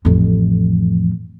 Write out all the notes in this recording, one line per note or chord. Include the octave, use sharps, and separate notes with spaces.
A1 F2